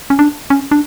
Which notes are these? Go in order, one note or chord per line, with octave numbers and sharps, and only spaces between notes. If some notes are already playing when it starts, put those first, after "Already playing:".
C#4
D4
C#4
D4